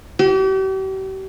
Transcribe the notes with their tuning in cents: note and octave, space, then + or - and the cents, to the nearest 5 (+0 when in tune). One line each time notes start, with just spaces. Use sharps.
G4 -40